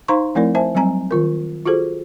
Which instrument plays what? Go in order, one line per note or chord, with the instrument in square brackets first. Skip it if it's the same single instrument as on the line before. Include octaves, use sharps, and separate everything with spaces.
[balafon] D#4 C5 F5 A#5 C6 C#6
F3 A3 C4 E4 A#4 D5
C5 E5 G#5 A5
F#3 G3 C4 G#5 A#5
D#3 F4 A#4
F4 F#4 G#4 A4 C5